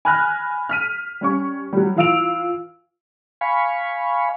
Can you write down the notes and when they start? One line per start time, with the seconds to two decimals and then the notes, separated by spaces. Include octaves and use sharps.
0.05 G#5 B5 F6 F#6 A#6
0.69 F6 B6 D#7
1.21 G3 C#4 C#6
1.73 F#3 G3
1.96 E3 F4 F5 E6 D7 F7
3.41 F5 G#5 B5 C#6